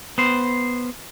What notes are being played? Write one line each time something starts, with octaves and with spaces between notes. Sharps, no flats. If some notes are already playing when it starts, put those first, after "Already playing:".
B3 C5